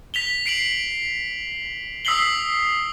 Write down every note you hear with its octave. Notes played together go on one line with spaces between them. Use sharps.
B6 F7 G7
C7 D7 F7 F#7
D#6 E6 B6 C7 F#7 G7